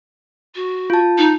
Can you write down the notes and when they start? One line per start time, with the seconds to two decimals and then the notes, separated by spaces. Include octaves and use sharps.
0.55 F#4
0.90 F4 A5
1.18 D#4